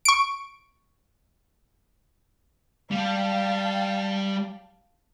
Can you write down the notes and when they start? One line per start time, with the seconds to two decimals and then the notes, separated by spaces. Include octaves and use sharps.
0.05 C#6 D7
2.91 G3 F5 G5 A5